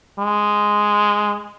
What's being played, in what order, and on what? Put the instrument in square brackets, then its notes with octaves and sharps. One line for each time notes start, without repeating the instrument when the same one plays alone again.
[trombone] G#3